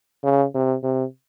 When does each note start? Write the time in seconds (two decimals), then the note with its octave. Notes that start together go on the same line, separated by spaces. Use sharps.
0.24 C#3
0.55 C3
0.83 C3